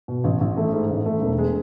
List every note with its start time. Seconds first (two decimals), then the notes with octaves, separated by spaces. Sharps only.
0.08 B2
0.24 A1
0.41 A1
0.57 A3
0.73 G#2
0.90 A1
1.06 A3
1.22 E1
1.38 G#3